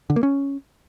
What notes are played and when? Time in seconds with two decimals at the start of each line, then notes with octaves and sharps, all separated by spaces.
0.10 D3
0.16 A#3
0.23 C#4